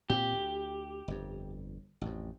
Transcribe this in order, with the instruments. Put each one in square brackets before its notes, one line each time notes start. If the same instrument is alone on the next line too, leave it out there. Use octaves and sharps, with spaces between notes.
[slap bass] A#2 C4 [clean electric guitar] G4
[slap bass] D2
G1 F2
A1 F2